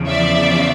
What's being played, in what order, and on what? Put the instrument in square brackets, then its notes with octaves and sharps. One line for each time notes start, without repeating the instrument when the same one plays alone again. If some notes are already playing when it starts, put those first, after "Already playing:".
Already playing: [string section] E2 C#3 F3
D5 E5